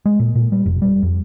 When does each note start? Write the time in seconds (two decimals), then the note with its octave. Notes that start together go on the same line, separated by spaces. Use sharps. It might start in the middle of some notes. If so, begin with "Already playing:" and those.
0.05 G#3
0.20 A#2
0.35 A#2
0.52 G3
0.66 F1
0.82 G3
1.03 F2